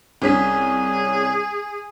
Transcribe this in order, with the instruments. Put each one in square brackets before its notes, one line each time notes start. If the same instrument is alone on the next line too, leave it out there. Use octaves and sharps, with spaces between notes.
[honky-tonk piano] C2 C#4 B6 [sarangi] G#4